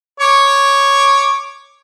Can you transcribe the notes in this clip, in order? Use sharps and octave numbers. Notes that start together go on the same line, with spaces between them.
C#5 D6